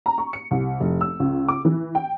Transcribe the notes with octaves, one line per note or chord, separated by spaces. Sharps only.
A#5
C#6
C#7
C2
F1
E6
C#2
D6
E3
G5